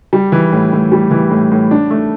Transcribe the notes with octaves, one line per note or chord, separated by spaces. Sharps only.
G3
E3
A2
A2
G3
E3
A2
A2
D4
A3